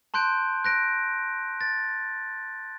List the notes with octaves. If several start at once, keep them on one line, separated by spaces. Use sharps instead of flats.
A5 C6 F#6 G6 D7
F#6 A#6 D7
A6